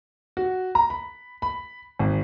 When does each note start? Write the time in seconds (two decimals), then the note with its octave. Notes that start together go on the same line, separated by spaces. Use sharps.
0.37 F#4
0.75 A#5
0.90 B5
1.42 B5
1.99 G#1